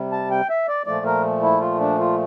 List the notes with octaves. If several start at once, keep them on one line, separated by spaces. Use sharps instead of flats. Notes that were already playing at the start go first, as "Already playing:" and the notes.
Already playing: C3 G3
A5
G5
E5
D5
A#2 F3 A3 D5
A#4
E4
F4
D4
F4